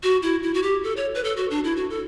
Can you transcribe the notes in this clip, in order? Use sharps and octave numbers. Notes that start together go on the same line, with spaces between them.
F#4
E4
E4
F#4
G4
A4
C#5
B4
A4
F#4
D4
E4
F#4
A4